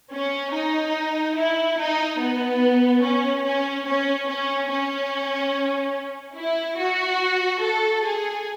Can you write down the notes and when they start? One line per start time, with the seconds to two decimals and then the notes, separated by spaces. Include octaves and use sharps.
0.12 C#4
0.53 D#4
1.37 E4
1.79 D#4
2.20 B3
3.04 C#4
3.45 C#4
3.87 C#4
4.29 C#4
4.71 C#4
6.37 E4
6.78 F#4
7.61 A4
8.04 G#4